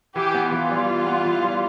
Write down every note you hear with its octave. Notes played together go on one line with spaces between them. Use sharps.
E3 G4
B3
E3 F4
G3
E3
B3
E3
G3